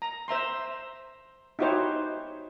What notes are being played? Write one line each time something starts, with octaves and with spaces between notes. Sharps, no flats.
A#5
C5 E5 A#5 C6
D#4 E4 F#4 G4 C5 C#5